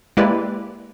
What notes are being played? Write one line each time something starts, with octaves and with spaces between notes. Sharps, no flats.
G#3 A#3 E4 G4 B4 D5